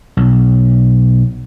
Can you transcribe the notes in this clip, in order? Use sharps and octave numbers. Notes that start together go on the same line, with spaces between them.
B1